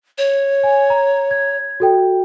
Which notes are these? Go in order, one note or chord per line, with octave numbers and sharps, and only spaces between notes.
C#5
G#5
A#5
G#6
F#4 A4 G5